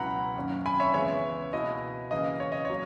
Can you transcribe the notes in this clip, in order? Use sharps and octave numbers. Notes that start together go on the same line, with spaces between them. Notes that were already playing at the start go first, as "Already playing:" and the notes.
Already playing: C#2 B2 F#3 C#4 E4 F#5 A#5 B5
F#2 D#3 A#3 C#4
G#5 B5
C#5 E5
C#2 C#3 E3 G#3 B3 C#5 E5
B2 A#3 E4 D#5
C#3 E3 A#3 D#5
C#5
D#5
F#3 A#3 C#5